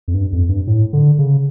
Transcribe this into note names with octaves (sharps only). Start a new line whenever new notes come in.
F2
G2
F2
G2
A2
D3
C#3